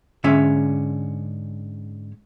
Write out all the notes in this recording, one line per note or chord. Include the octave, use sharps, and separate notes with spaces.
G#2 D3 C#4 E5